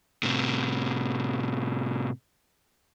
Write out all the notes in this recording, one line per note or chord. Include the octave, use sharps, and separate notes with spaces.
A2 C3